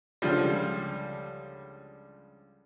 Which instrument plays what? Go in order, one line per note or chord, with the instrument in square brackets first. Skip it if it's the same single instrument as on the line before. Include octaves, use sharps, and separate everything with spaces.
[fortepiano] C#2 D3 F3 G3